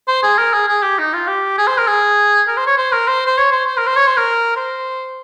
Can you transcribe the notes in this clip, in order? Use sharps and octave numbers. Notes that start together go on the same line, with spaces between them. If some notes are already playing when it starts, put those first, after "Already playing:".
C5
G#4
A#4
G#4
G#4
G4
D#4
F4
G4
G#4
C5
A#4
G#4
A#4
C5
C#5
C5
A#4
C5
C5
C#5
C5
C5
A#4
C5
C#5
C5
A#4
C5